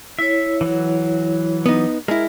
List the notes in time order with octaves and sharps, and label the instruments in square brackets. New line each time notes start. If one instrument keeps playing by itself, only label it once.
[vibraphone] E4 C#5 [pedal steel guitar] E5
[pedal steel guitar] E3 F#3
[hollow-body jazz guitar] B3 D#4
[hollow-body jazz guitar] G#3 E4 [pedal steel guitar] A#4